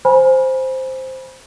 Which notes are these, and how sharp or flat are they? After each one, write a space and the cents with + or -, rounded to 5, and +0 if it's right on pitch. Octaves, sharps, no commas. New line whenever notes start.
C5 +0 G#5 +0 B5 -30